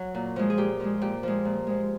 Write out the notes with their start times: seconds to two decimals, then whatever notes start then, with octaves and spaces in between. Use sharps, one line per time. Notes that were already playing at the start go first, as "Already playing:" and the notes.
Already playing: F#3 F#4
0.15 A#2
0.36 F3 G#3
0.50 G#4
0.57 A#2 G4
0.80 F3 G#3
1.01 A#2 G4
1.23 F3 G#3
1.45 A#2
1.67 F3 G#3